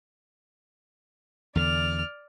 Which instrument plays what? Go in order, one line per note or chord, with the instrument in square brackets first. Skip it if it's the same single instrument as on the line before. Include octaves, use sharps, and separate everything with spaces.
[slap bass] E2 D3 [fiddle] D5 F6